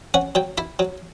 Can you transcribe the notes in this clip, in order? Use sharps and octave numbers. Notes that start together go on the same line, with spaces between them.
C#4 F#5
F#3 G5
E4 B5
F#3